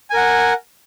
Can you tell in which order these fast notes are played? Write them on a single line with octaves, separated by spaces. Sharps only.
G#5 A#4 F#5